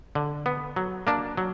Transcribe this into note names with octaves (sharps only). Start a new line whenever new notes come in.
D3
B3
F#3
A#3 D4
F#3